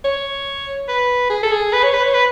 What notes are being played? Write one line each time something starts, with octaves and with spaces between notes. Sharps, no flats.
C#5
B4
G#4
A4
G#4
B4
C#5
B4
C#5
B4